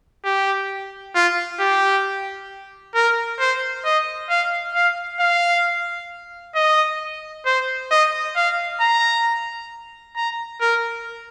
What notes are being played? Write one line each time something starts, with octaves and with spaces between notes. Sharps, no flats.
G4
F4
G4
A#4
C5
D#5
F5
F5
F5
D#5
C5
D#5
F5
A#5
A#5
A#4